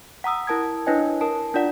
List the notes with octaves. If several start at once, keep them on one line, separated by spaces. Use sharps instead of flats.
F#5 A#5 D#6 E6
E4 A#4 A5 D#6 G#6
D4 E4 B4 C#5 D#5 G#5
A#4 A5
D4 F4 D5 F#5